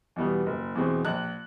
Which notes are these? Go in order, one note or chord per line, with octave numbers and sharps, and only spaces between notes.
E2 B2 G3 B3
F#1
E2 B2 G#3 C4
A#1 F#6